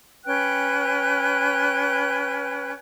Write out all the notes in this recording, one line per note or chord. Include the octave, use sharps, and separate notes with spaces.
C#4 B4 G5 F#6